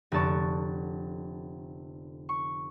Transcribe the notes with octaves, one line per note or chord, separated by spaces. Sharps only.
F1 D3 B3 A5 C#6 D7
C#6